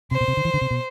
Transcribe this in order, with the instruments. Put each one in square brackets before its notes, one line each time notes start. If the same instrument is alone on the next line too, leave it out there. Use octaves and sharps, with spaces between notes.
[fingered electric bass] C3 [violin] C5
[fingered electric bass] B2
C3
D3
E3
D3
C3
B2